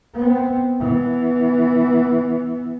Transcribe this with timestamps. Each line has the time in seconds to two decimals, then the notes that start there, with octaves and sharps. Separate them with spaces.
0.15 B3 C4
0.80 E3 B3